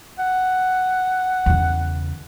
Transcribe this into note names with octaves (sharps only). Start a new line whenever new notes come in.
F#5
E2 C#3